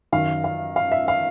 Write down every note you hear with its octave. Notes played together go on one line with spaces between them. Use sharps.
F#2 D#3 F5
F5
F5
E5
F5